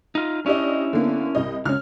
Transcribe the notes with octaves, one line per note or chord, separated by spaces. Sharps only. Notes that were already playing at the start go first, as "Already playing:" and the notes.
D#4 F4
C#4 D4 E4 G4 D#5
D3 A#3 B3
C2 D#5
C#2 C#4 F6